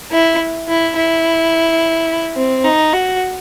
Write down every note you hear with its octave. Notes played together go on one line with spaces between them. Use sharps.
E4
E4
E4
C4
D#4
F#4